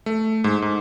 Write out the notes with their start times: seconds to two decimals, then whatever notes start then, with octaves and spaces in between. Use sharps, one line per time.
0.06 A3
0.44 G#2
0.62 G#2